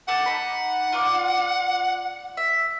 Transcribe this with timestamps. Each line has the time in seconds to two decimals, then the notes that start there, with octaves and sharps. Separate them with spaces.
0.08 A3 F#5 A5 D6
0.26 D#4 B5
0.92 F4 D5 D6
2.37 E5